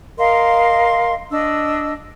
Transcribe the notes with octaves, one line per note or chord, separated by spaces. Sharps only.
A#4 D#5 F5 C6
D4 D#5 E6